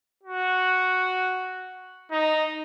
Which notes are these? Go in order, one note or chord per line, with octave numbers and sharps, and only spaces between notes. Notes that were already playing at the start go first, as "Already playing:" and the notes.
F#4
D#4